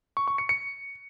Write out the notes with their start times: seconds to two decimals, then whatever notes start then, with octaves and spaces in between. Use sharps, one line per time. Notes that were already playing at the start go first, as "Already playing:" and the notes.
0.17 C#6
0.28 C#6
0.38 C#7
0.49 C#7